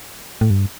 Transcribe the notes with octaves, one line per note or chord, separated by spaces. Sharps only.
A2
G2